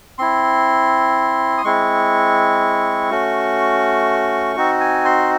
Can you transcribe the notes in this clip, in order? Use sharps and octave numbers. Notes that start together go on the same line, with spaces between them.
C4 E4 C6
D#6
G#3 C4 E4 C#6
A3 C#4 F#4
C4 D#4 F#4
G#5
C6